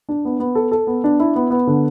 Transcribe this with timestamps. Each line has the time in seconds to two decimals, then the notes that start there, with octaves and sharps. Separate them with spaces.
0.09 D4
0.25 B3
0.40 B3
0.55 A4
0.71 A4
0.87 B3
1.04 D4
1.20 E4
1.36 B3
1.50 B3
1.67 D3